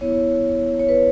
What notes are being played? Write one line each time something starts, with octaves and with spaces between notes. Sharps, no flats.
B3 E4 C#5
C#5
B4